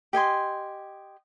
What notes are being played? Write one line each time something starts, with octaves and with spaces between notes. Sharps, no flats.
G4 D#5 G#5 C6